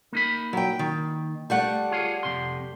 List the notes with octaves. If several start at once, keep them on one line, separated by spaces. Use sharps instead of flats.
A#3 D#4 B5
F#3 G5
D#3
G3 A3 F#5
F4 G#4 C#5
F2 C3 C6